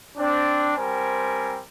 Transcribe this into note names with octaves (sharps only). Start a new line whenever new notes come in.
C4 D4
G3 C4 A#4 C5 G#5